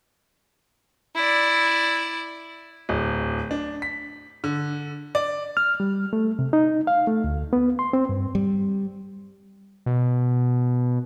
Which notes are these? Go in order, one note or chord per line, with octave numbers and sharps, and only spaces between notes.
E4 D5
D1
D4
B6
D3
D5
F6
G3
A3
C3
D#4
F5
A3
D2
B3
C6
C4
G2
G3
B2